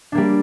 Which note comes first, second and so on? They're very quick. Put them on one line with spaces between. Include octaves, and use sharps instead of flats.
D4 A#3 G3